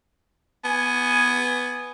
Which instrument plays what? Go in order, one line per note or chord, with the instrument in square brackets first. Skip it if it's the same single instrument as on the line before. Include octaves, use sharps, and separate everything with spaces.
[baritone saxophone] B3 [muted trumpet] G#5